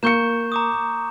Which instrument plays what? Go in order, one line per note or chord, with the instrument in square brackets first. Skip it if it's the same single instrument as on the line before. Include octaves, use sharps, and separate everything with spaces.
[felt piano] A#3 C#7 [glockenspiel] C#6 G6 E7
[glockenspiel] A#5 D6 D#6